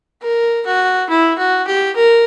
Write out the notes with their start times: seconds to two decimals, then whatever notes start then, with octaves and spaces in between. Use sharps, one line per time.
0.22 A#4
0.66 F#4
1.09 E4
1.38 F#4
1.67 G4
1.96 A#4